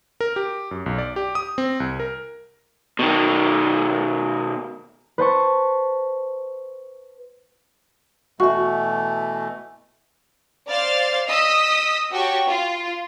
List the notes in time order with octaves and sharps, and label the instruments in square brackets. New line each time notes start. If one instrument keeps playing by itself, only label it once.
[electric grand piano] A#4
G4
F#2
B1
D5
G4
D#6
C4
C2
A#4
[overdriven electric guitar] B2 D#3
[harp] B4 C5 A5 C#6
[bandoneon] B2 E3 A3 [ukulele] F#4 [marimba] E5 C#6
[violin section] C5 D5 F5 F6 A6
D#5 D#6 E6 B6
F#4 G4 C#5 G5 A5 C#6
F4